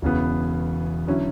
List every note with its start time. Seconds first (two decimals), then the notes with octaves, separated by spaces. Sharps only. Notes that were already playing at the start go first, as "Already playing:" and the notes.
0.02 E1 E2 C#3 E3 B3
1.07 D3 F#3 C#4 E4